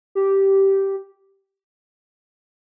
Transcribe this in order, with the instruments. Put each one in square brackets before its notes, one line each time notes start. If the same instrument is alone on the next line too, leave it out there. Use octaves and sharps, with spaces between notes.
[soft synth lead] G4